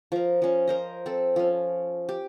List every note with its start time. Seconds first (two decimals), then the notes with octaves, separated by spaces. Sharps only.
0.12 F3 A#4
0.42 F3 C#4
0.68 A#4 C5 D#5
1.06 C4 A4
1.36 F3 C#4
2.09 G4